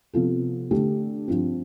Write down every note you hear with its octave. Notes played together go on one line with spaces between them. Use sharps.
C3 F3 B3 F4 A4
D3 A3 D4 G4
G2 F3 C4